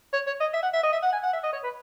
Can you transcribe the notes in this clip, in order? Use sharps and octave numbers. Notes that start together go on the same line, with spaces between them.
C#5
C#5
D#5
E5
F#5
E5
D#5
E5
F#5
G#5
F#5
E5
D#5
C#5
B4